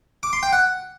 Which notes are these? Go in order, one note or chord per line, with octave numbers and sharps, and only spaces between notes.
D6
C6
G5
F#5